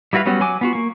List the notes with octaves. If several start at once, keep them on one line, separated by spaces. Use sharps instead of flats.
G3 E4 F#4 B4 F5
F#3 G3 B3 C#4 F#4
F#3 G#5 D6
B3 F4 F#4
A#3 C#6